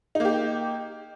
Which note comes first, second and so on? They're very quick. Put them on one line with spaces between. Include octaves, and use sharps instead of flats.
D#4 A#3 G4